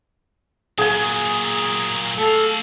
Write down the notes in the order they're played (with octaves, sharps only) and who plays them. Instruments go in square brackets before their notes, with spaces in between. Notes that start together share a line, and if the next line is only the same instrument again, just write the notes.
[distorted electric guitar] A#2 F#3 [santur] G#4 G#5
[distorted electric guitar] A3 F5 [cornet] A4